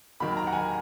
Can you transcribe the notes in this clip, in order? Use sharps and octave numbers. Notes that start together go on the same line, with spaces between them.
D#2 D#3 F#3 A#3 B5
A#5
F#5
G#5